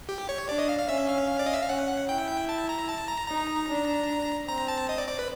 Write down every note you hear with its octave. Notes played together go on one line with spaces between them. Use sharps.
G4
C#5
D4 D5
D#5
F5
F5
C#4 E5
F5
D5
D#5
E5
F5
C#4 F#5
E4 G5
A5
A#5
A5
A#5
D#4 A#5
D4
C4 A#5
A5
D#5
D5
D5
B4